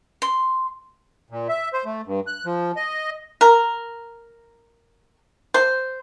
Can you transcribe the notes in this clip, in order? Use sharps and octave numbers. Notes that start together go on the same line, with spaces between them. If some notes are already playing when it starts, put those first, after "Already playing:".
C6
A#2
E5
C5
A3
G2
F#6
F3
D#5
A#4
C5